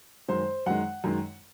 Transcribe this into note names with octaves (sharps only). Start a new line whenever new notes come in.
F#2 D#3 G#3 C5
F#2 D#3 G#3 F#5
F#2 D#3 G#3